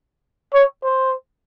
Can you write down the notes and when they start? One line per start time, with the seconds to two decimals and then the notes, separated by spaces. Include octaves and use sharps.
0.54 C#5
0.84 C5